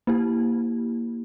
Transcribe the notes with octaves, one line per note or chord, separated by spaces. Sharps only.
A#3 E4 G4